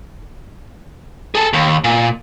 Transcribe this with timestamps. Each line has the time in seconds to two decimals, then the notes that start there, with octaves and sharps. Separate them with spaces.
1.35 G#4 A4
1.53 D#2
1.84 A#2